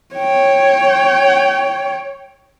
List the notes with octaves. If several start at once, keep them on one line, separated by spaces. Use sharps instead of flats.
C#5 G5